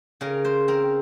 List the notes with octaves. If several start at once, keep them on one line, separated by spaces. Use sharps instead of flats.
C#3 A#4 A#5
C5 C6
C4 A#4 A#5